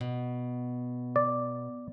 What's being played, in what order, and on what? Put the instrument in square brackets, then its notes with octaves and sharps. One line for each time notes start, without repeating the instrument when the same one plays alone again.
[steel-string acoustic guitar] B2
[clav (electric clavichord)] D5